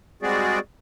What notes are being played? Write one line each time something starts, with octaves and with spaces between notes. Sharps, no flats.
G3 G#3 C4 F#4 G#4 D5